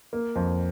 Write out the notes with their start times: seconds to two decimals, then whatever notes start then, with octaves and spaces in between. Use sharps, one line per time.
0.13 A#3
0.36 F2